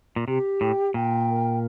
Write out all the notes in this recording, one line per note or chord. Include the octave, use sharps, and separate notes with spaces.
A#2
C3 G4
A2 G5
A#2 G5
A#4